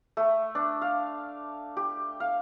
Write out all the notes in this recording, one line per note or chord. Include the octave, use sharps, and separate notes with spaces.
A3
D4
F5
G4
F5